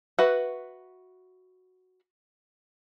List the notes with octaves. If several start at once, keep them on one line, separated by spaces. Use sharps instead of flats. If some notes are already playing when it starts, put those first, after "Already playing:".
F#4 B4 E5 F#5